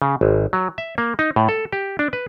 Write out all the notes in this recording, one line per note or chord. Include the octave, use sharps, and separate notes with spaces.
C#3
G#1
F#3
E5
A#3
D#4
A2
A4
G4
D4
B4